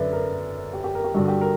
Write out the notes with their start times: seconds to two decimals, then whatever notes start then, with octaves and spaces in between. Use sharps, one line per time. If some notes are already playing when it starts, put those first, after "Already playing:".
Already playing: F#2 D3 B4 D5 E5
0.13 A#4
0.73 G4
0.84 G4
0.95 A#4
1.04 G4
1.14 G2 D3 F#4
1.28 G4
1.41 A#4